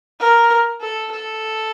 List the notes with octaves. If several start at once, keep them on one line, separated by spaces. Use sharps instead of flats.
A#4
A4
A4